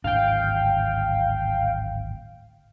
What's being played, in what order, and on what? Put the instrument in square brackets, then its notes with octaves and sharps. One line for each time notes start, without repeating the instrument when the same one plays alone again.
[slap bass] D1 G#1 D4 [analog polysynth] F5 G5